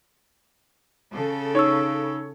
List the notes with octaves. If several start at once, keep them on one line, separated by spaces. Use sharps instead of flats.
C#3 A4
D#4 C#5 C#6 E6